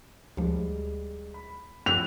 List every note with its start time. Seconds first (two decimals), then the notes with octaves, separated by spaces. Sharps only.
0.37 D2 F3 G3 G#3
1.34 B5
1.86 A2 F3 E6 F#6 F7